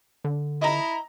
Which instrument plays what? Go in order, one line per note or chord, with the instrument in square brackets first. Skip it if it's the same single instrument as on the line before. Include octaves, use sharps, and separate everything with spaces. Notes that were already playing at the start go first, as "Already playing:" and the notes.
[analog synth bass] D3
[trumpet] E4 [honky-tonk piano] D#5 A#5